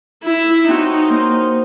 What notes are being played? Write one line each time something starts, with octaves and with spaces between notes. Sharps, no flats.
E4
C4 D#4 F#4 C#5
A#3 C5